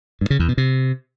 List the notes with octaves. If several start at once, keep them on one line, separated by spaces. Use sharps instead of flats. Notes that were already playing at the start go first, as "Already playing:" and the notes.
G2
C#3
E2
B2
C3